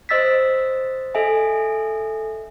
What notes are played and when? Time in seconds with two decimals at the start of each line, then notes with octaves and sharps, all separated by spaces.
0.09 C5 D#5 E6 A6 B6
1.15 A4 D#5 E5 G#5